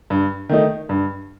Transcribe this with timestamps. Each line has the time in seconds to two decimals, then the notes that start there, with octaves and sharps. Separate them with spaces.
0.10 G2
0.49 D#3 A3 D#4
0.89 G2